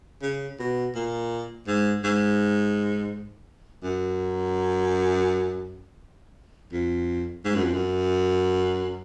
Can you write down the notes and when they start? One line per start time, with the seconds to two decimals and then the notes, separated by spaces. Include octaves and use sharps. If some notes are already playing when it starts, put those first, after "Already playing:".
0.23 C#3
0.60 B2
0.95 A#2
1.67 G#2
2.04 G#2
3.83 F#2
6.73 F2
7.45 G#2
7.55 F#2
7.64 F2
7.73 F#2